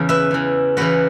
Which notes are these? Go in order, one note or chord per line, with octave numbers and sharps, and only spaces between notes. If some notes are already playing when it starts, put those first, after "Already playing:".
Already playing: E2 C#3 E3
B4 E5
E2 C#3 E3
E2 C#3 E3 F#4 B4